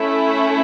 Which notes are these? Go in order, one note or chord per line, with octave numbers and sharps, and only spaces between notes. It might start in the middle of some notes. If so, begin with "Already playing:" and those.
Already playing: A3 C#4 E4